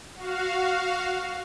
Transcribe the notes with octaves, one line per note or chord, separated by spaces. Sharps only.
F#4 F5